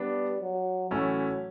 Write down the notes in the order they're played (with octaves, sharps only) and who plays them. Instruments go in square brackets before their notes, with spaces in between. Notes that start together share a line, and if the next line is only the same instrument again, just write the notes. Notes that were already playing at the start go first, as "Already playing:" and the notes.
Already playing: [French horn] G3 [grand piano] B3 D4
[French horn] F#3
[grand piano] A2 E3 A3 C#4 E4 [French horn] F#3